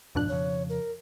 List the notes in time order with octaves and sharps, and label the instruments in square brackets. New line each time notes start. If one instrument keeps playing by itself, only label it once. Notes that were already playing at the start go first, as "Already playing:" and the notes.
[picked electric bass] F2 G#2 F3 [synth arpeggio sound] B2 D4 F#6
[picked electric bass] F2 C#3 F3 [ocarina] C#5
[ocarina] A#4